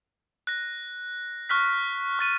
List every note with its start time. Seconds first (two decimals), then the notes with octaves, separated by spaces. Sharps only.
0.47 F#6 A#6
1.49 C#6 F6 F#6 B6
2.19 C#6 A6 D#7